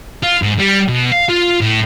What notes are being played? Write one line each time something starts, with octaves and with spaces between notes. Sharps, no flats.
F4
G#2
G3
B2
F5
F4
A2